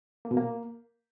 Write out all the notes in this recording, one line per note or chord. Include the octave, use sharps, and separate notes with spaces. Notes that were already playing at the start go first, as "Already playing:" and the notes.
A#3
B2
A#3